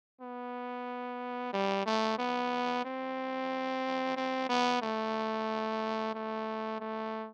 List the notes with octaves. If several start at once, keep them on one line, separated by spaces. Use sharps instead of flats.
B3
G3
A3
B3
C4
C4
B3
A3
A3
A3